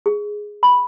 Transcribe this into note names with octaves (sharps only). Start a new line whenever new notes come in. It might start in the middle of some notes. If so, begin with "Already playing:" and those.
G#4
B5